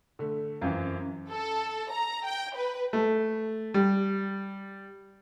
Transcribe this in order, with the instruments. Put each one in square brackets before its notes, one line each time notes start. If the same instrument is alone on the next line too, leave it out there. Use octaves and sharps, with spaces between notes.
[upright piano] D3 A3
[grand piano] F#2 [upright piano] E3 C4 F4
[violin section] A4
A#5
G5
B4
[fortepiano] A3
G3